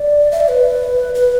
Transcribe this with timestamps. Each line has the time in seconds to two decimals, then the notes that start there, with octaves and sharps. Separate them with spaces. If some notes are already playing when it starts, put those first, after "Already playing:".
Already playing: D5
0.32 E5
0.40 D5
0.49 B4
1.15 B4